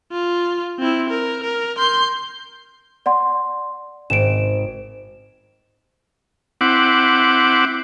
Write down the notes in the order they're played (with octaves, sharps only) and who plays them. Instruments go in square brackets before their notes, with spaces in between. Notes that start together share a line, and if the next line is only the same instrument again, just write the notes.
[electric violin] F4
C4 E4
A#4
A#4
C6 G6
[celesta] D5 F#5 C6
[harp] G#1 [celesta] D7 E7
[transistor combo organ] C4 E4 F#5 D6